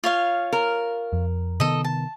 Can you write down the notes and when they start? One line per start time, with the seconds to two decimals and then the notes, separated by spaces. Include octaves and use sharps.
0.04 F4 C#5 F5
0.53 A#4
1.13 F2
1.60 C3 D#3 B3 A4 D#5
1.84 A5